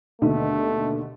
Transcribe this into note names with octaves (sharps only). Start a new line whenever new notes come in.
D#2 B2 D3 A3